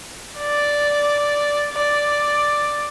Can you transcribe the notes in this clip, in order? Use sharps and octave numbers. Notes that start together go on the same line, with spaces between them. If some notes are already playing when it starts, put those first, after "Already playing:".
D5
D5